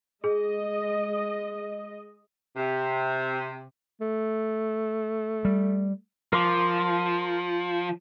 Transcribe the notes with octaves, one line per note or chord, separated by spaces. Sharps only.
G#3 G#4 D#5
C3
A3
G3
F3 A#4 C6 D6